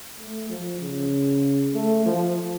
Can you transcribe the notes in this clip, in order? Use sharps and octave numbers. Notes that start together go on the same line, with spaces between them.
A3
F3
C#3
A3
F3